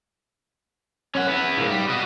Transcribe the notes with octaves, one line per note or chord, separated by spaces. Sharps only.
C#4 F#5
B3 E4
G#2 A#3
G3
F#4 D#5